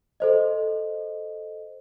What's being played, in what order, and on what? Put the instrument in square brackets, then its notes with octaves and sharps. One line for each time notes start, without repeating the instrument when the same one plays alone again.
[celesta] A4 C5 D#5